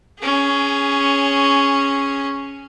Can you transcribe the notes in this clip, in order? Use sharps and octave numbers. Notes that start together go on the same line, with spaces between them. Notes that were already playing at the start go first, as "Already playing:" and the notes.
C#4 G#4